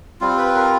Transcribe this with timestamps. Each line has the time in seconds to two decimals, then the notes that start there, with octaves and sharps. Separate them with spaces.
0.21 G3 C4 F4
0.38 B4
0.55 A#4